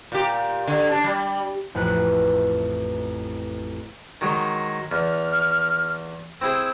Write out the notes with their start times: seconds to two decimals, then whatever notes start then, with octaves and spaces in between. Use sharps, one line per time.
0.12 A#2 G4
0.67 D3
0.91 D4
1.04 G3
1.75 A1 F2 B4 F#6
4.21 D#3 F#3 G#3
4.92 E2 F6
6.41 C4 E4 G#4 E6